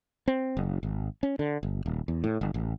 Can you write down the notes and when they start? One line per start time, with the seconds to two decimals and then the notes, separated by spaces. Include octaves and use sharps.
0.28 C4
0.57 F#1
0.83 G#1
1.23 C#4
1.39 D3
1.63 G1
1.86 D#1
2.08 E2
2.24 A2
2.41 G1
2.54 A1